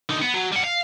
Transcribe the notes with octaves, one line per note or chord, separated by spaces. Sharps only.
D3 D#4
B3
F#3
G3 F#5
F5